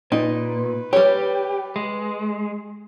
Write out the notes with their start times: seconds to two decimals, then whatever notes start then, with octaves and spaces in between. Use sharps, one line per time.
0.12 A#2 D#4 B4
0.93 G3 G4 C#5
1.76 G#3